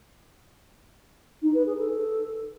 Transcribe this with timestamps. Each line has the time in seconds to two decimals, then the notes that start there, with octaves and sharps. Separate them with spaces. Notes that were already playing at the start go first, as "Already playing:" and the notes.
1.43 D#4
1.54 B4
1.66 G#4
1.78 A4